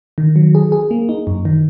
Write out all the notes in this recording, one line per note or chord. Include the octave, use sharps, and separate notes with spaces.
D#3
F#3
G#4
G#4
A#3
D#4
F#2
D#3